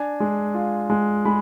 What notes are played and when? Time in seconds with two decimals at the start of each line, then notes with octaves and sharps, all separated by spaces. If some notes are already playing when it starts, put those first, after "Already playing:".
Already playing: D4 G#5
0.20 G#3
0.54 F4
0.90 G#3
1.25 G#3 B5